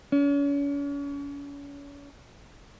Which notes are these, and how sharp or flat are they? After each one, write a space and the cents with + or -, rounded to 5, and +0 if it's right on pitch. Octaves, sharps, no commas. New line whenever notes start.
C#4 +40